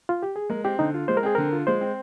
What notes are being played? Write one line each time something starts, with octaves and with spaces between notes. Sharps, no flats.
F4
G4
G#4
G#3 A#4
C4 G4
D3 D#4
F4
G#3 C5
A#4
C4 G#4
D3 A#4
F4
G#3 C5
C4